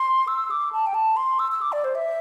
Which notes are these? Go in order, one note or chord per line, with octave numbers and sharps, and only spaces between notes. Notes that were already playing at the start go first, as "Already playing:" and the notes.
Already playing: C6
E6
D6
A5
G5
A5
C6
E6
E6
D6
D5
C5
E5